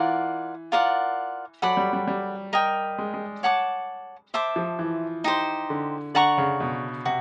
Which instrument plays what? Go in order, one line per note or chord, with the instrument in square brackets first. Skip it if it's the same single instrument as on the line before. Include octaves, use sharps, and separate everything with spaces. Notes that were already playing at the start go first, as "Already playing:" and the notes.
Already playing: [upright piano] E3 [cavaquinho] F4 A#4 D5 F#5
[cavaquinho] F4 A#4 D5 F#5
[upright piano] F#3 [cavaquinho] A4 D5 F#5 B5
[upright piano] G3
G3
G3
[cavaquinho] A#4 D#5 G5
[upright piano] G#3
G#3
[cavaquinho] C#5 F#5 A5 D6
C5 E5 A5 D6
[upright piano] F3
E3
[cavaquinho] D#4 G4 C5
[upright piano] D3
[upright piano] D3 [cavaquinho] D5 F#5 A#5 C#6
[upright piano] C#3
B2
[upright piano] C3 [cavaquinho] F#4